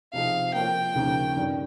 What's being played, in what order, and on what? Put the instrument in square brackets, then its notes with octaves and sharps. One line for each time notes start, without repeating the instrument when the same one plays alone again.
[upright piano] C3 F3 C4 D#4 G#4 [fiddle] F5
[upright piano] F3 A#3 F4 A#4 C#5 [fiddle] G5
[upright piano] D#2 C#3 F3 A#3
G2 D#3 G3 C#4